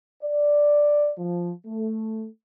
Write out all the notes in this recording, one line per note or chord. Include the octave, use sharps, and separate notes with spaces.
D5
F3
A3